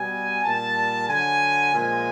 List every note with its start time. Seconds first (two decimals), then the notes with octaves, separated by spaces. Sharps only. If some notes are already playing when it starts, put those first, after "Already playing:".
Already playing: B2 G3 G#5
0.43 A#2 G3 A5
1.08 D3 F#3 G#5
1.74 A#2 F3 G#3 G#5